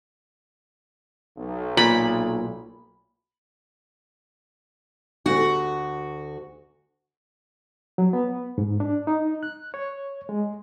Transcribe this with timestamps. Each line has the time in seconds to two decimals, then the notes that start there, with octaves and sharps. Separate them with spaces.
1.37 B1
1.77 A#2 B5
5.26 D2 F#4
7.98 F#3
8.13 B3
8.58 G#2
8.80 D4
9.07 D#4
9.43 F#6
9.74 C#5
10.29 G#3